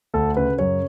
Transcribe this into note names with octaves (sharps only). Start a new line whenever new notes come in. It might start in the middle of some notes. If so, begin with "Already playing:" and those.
D2 A4
C#3 B4
F#2 C#5